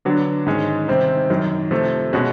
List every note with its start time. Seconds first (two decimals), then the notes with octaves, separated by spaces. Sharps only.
0.05 D3 F#3 B3 D4
0.46 G#2 D#3 G#3 C#4
0.88 C3 D#3 G3 C4
1.30 F#2 D#3 F#3
1.71 C3 F3 A3
2.13 B2 G#3 C#4 F#4